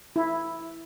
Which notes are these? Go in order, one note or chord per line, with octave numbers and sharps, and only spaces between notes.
E4